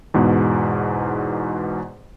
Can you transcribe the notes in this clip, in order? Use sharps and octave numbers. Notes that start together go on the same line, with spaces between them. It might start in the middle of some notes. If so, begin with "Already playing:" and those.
E2 G#2 B2